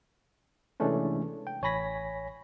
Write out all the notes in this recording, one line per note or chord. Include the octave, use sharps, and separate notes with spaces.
C3 E3 G#3 A3 C#4 D4
G5
A1 C#5 G#5 B5 A#6 B6